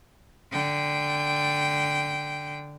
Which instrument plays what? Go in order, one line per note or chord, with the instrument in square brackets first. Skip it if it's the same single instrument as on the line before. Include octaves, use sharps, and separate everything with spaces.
[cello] D3 G5